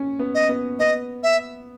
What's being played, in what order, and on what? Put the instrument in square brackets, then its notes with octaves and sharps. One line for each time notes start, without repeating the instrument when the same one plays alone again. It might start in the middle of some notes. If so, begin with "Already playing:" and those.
Already playing: [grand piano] C#4
B3
[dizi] D#5
[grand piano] B3
[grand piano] B3 [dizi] D#5
[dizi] E5